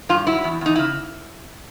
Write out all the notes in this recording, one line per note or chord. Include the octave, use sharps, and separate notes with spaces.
G2 F4
F#3 E4
E2
E2 D#4
C#3 E4